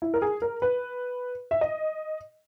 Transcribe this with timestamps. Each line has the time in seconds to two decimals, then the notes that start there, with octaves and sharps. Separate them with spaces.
0.02 E4
0.14 A#4
0.22 G#4
0.42 A#4
0.62 B4
1.51 E5
1.61 D#5